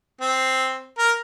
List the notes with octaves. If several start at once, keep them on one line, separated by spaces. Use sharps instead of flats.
C4
A#4